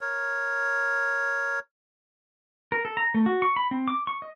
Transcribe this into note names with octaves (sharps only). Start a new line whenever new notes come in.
A#4 C#5
A#4
A4
A#5
A3
F#4
C#6
B5
C4
D6
C#6
D#5